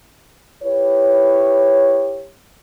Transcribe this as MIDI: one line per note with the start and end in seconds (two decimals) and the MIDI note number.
0.63 2.29 64
0.63 2.29 67
0.63 2.29 71
0.63 2.29 73